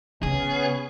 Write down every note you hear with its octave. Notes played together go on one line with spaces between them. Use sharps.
C#3 B3 C#4 G#4